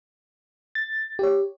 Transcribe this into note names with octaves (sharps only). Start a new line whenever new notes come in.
A6
G4 C#5